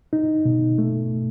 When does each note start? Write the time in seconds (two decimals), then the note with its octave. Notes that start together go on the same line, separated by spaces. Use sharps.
0.13 D#4
0.45 B2
0.78 A3